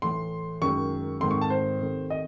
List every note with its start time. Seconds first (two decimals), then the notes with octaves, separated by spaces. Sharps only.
0.02 A2 E3 A3 C6
0.62 F#2 D#3 G#3 C#6
1.21 G#2 D#3 A3 C4 C6
1.31 C#6
1.41 A5
1.50 C5
1.81 C3 D#3 A3
2.10 D#5